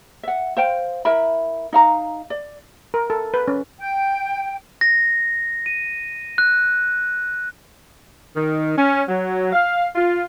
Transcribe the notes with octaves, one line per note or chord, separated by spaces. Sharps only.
E5 F#5
C5 F5 G5
E4 A#4 E5 B5
D#4 F5 A#5
D5
A#4
A4
B4
C#4
G5
A#6
D#7
F#6
D#3
C#4
F#3
F5
F4